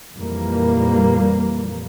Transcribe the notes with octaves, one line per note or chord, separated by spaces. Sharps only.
F2 A#2 E3 G3 A#3